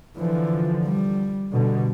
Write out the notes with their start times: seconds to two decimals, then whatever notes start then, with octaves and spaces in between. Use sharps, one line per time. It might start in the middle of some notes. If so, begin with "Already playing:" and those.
0.17 D3 E3 F3
0.85 G3
1.53 B2 D3 G3